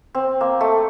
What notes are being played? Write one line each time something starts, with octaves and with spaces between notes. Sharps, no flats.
C4
A#3
A3